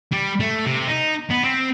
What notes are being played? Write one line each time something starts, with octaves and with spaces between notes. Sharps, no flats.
G3
A3
C3
D#4
B3
C4